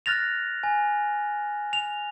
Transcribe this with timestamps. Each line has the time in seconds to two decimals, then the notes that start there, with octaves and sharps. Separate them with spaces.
0.06 F6 F#6 A6 A#6 F7
0.63 G#5
1.73 F7